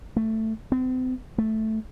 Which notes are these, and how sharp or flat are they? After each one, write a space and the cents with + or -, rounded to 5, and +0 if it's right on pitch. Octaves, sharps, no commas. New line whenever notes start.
A3 +10
C4 -40
A3 -5